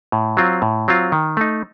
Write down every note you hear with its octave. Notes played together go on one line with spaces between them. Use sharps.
A2
F#3 C4 F4
A2
F#3 C4 F4
D#3
A3 D#4